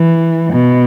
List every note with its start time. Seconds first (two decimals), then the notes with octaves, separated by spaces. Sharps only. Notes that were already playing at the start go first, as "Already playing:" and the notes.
Already playing: E3
0.53 B2